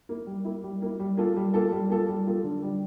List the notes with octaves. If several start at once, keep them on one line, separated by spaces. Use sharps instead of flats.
A#3 E4
G3
A#3 E4
G3
A#3 E4
G3
A#3 F4 A4
G3
A#3 F4 A4
G3
A#3 F4 A4
G3
A#3 F4 A4
D3
G3 D4